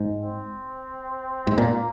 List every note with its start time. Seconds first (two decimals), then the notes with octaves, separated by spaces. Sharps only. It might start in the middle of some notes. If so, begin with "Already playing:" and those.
Already playing: G#2
0.20 C4
1.47 G#2
1.57 A#2 A#3